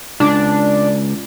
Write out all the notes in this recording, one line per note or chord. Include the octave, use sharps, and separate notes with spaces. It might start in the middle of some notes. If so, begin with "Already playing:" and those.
C#2 D4